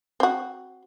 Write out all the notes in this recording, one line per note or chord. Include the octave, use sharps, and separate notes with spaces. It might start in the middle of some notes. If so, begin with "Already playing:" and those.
C4 F#4